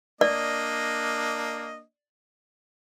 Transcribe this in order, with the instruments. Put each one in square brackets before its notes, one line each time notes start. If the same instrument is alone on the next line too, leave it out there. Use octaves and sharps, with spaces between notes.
[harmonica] A#3 D4 D#5 [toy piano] D5